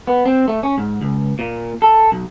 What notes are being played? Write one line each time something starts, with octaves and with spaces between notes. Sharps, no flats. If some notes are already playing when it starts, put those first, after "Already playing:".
B3
C4
A3
C#4
G#2
C#2
A#2
A4
B1